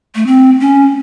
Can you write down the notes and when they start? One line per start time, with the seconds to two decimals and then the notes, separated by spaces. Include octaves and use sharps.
0.15 A3
0.27 C4
0.60 C#4